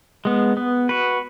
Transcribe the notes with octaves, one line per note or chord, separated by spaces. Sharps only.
G#3 B3
B3
F#4 B4